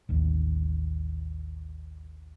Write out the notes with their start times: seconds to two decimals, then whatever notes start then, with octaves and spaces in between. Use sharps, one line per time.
0.09 A1 D#2